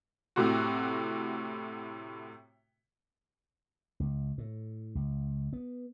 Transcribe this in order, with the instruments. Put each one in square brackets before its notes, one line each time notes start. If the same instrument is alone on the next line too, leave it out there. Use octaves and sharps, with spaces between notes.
[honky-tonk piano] A2 C3 F#4
[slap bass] C#2
A2
C#2
B3